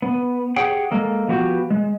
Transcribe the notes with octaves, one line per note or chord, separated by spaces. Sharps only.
B3
G4 G#4 C#5 F#5 G5
G#3 A#3 A4
F3 B3 F#4 G4
G#3